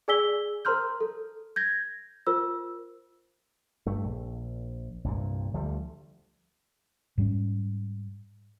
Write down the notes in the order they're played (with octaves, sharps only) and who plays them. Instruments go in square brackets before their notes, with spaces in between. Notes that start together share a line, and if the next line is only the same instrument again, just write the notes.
[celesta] G#4 D5 G#5 E6 B6 G7
A#4 C5 A#5 C6 F6 G6
A4
G6 G#6 A#6
F4 A#4 C5 E6
[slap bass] G2 A3
A#1
C2 G2 A#2
D2 F3 G3 A3
[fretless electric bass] G#2 G3 G#3 C#4